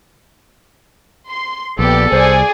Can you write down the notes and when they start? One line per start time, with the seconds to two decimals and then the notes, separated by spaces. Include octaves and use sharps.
1.29 C6
1.79 A#1 B3 G4 A4 D5
2.12 C2 G#4 C5 D5 G#5